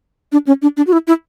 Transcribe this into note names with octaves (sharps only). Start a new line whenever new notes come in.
D4
C#4
D4
D4
F#4
E4
E4